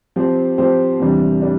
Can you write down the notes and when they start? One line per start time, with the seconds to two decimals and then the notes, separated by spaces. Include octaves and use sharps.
0.16 F3 C4 G4 C5
0.58 F3 C4 G4 C5
1.00 E2 C3 G3 D4
1.42 G3 D4